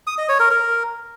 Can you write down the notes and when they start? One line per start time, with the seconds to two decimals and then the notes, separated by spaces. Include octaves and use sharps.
0.07 D#6
0.18 D#5
0.29 C#5
0.40 A#4
0.51 A#4